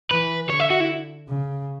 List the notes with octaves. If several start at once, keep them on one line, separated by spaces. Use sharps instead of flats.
E3 B4
D3 C#5
E5
F#4
E4
C#3